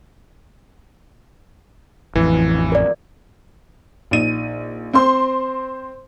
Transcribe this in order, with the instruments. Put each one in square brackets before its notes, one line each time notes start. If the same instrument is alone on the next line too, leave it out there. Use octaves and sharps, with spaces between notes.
[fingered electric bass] A1 F2 [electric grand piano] E3
[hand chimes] A#4 D5
[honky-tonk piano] A#1 D#4 D#7
C4 C5 C6